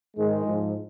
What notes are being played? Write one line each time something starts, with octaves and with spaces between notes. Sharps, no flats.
G#2 D#3 G#3
G#2 F3